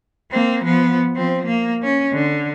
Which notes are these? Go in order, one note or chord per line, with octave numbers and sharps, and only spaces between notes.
A#3 C4
F3 B3
F3 C4
A#3
C#4
D3